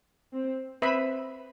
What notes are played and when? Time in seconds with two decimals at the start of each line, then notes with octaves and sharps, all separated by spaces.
0.34 C4
0.82 C4 B4 E5 B5